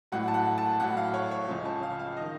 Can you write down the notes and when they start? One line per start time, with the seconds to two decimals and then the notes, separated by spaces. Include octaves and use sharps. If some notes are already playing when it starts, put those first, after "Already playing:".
0.12 A1 A2 F#3 F#5
0.28 A5
0.34 F#5
0.58 A5
0.80 A1 A2 F#3 F#5
0.97 F5
1.14 C#5
1.31 C#5
1.48 C#2 C#3 F3
1.65 A5
1.83 F5
1.99 F5
2.17 D#3 D#5